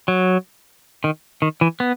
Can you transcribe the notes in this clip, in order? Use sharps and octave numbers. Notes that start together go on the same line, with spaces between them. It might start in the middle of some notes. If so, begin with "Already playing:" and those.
F#3
D#3
D#3
E3
B3